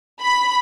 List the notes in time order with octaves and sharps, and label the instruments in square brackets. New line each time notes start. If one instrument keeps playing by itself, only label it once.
[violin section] B5